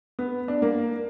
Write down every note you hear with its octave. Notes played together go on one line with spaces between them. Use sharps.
B3
D4
A#3